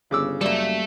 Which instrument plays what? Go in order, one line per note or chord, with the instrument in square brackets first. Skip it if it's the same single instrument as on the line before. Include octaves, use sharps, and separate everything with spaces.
[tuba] G1 [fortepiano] C#3 D6 E6
[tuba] F#2 [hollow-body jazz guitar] G3 A#3 [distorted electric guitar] A4 E5